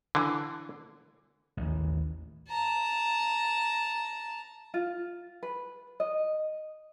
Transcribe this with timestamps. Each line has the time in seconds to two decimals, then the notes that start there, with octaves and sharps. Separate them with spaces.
0.15 D3 E3
1.57 A1 D#2 E3
2.49 A5 A#5
4.74 F4
5.43 B4
6.00 D#5